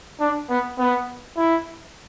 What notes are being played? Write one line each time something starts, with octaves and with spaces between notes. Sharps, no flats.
D4
B3
B3
E4